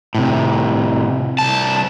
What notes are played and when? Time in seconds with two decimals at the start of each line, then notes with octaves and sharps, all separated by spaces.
0.15 A2 C3
1.39 C2 A5